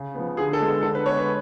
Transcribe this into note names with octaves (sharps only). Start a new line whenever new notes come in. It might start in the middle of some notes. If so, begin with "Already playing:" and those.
Already playing: C#3
F3 B3
D3 G#4
A4
G#3 B3
A4
D3 A4
B4
G#3 B3 C#5
B4